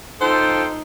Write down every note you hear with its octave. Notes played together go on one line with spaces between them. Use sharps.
D#4 F4 A4 C5 G5